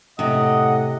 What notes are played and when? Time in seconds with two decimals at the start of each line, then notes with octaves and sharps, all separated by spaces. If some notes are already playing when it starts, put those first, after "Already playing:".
0.19 A2 C3 D#5 F#5